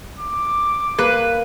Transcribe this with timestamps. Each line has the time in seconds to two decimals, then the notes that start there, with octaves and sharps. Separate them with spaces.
0.19 D6
0.99 A#3 B4